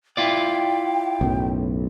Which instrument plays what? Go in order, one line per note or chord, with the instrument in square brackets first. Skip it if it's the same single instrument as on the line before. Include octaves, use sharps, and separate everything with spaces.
[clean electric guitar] E4 F4 D5 [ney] G5
[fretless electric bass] B1 F#2 A2